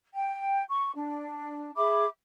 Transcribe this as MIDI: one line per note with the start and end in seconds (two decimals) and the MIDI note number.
0.14 0.61 79
0.68 0.90 85
0.95 1.70 62
1.76 2.05 68
1.76 2.05 76
1.76 2.05 83
1.76 2.05 86